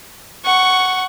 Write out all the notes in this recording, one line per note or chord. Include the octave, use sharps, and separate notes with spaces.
F#5 C#6